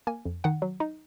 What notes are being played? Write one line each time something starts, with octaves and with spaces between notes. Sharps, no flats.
A#3 G#5
F2
D#3 F#5
F#3
D#4